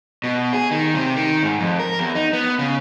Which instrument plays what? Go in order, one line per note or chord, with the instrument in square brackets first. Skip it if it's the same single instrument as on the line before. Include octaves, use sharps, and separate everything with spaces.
[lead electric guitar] B2
G#4
D#3
C3
D#3
G#2
F2
A#4
E2
D#4
B3
C#3